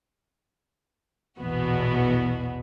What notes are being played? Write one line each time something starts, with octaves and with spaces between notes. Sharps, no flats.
A#1 E2 B2 B3 F#4